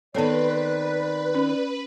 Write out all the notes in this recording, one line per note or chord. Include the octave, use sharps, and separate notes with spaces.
D#3 B3 C4 A4 B4 C#5 D5
C#4